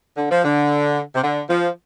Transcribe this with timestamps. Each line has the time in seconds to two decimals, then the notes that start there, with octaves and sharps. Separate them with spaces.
0.17 D3
0.31 F3
0.44 D3
1.15 C3
1.24 D3
1.50 F3